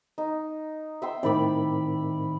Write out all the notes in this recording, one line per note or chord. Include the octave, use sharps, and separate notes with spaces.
D#4
E5 G5 C6
A2 D#3 C4 D5 B5 D6